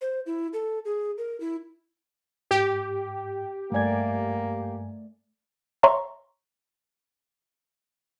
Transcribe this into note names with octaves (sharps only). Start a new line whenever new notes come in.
C5
E4
A4
G#4
A#4
E4
G#2 G4
G2 A3 A#3 D5 G#5 G#6
C#5 E5 A#5 C6 C#6